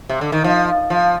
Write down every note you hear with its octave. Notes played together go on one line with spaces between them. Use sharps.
C3
D3
D#3
F3
F3